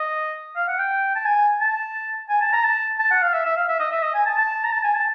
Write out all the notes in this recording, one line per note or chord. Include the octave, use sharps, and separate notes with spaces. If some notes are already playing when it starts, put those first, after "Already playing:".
Already playing: D#5
F5
F#5
G5
A5
G#5
A5
G#5
A5
A#5
A5
A5
F#5
F5
E5
E5
F5
E5
D#5
E5
D#5
G#5
A5
A5
A#5
A5
G#5
A5